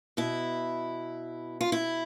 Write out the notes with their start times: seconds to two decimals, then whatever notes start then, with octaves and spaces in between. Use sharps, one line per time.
0.17 B2 E4
1.61 F4
1.72 E4